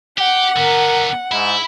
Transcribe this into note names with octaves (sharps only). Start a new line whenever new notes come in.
G4 F#5
D3 B3 A#4
G#2 E4